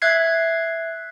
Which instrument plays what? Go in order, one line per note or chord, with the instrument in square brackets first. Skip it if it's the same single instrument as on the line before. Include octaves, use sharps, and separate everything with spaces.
[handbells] E5 F#6 G#6 C7